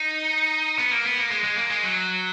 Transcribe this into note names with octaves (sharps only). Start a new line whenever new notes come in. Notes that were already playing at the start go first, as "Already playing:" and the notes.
Already playing: D#4
B3
A#3
B3
A#3
G#3
G#3
A#3
G#3
F#3